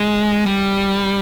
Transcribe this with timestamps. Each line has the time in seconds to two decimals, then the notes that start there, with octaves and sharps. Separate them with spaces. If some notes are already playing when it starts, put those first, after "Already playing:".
Already playing: G#3
0.46 G3